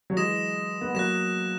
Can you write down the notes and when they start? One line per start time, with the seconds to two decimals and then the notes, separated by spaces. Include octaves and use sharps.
0.10 F#3
0.17 E3 G#3 D#6 A#6 E7
0.81 B3
0.94 F#3 A#3 F#6 A#6 E7